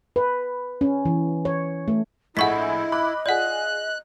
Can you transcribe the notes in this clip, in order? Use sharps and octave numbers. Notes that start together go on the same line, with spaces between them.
B4
C#4
E3
C#5
A3
A#1 A2 E4 G#4 D#5 F#5 C#6 B6
B5 D6 F#6
F4 G#4 D5 F#5 F#6